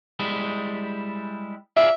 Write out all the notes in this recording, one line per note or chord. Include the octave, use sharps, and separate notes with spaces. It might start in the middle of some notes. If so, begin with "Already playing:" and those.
G3 G#3 E4
F4 G#4 D5 E5